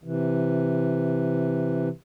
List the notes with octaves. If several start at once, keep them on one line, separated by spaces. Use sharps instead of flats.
C3 E3